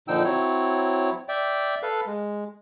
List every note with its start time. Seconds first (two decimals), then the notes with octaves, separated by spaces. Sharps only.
0.08 A#2 D3 F3 D#4 G5 E6
0.24 F#3 C4 E4 C#5
1.29 D5 E5 G5
1.83 A4 B4 F5
2.07 G#3